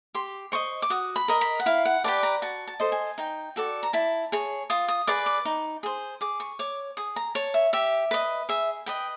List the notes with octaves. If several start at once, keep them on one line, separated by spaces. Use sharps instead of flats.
G4 C6
C5 D#5 C#6
D6
F#4 D#6
B5
A#4 D#5
B5
F#5
E4 F5
F#5
G4 B4 D5 A5
A#5
F#4 A5
A5
A4 C5 D#5
G#5
D#4 G5
F#4 A4 D5
A#5
E4 A5
G#4 C#5
F4 D#6
D#6
G#4 B4 D5 D6
D6
D#4
G#4 C5
G#4 D6
C#6
C#5 D6
G#4 D#6
A#5
C#5 A5
E5
G4 E5
B4 D#5
G#4 E5
B4 D#5 G5